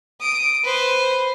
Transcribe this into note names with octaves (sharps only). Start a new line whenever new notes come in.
D#6 D7
B4 C5